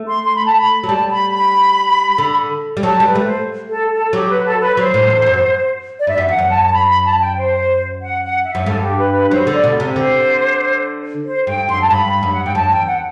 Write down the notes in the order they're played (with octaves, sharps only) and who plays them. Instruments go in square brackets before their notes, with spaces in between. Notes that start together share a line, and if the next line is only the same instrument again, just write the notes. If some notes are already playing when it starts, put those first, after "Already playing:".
Already playing: [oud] A3
[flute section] C6
C6
B5
A5
B5
[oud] F#3
[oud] G3 [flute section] A5
[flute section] B5
B5
[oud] D3
G3
[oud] F#3 [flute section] A5
[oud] G3 [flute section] B4
[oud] A3
[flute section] C5
A4
A4
[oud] F#3 [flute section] G4
[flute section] B4
A4
B4
[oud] F#3 [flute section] C5
[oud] A2
E2
E2
F#2
[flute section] D5
[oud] G2 [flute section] E5
[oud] F#2
[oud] E2 [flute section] F#5
[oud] F#2
[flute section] A5
A5
B5
B5
A5
G5
C5
F#5
F#5
E5
[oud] F#2
[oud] G2 [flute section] A4
[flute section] G4
B4
B4
[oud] F#3 [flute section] C5
[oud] D3
[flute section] D5
[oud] B2
C3
[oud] D3 [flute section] C5
[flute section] C5
[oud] G2 [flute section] G5
[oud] F#2 [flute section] C6
[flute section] A5
[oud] G2 [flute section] B5
[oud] F#2
[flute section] F#5
[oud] G2 [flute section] G5
[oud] F#2 [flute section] A5
[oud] E2 [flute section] G5
[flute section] F#5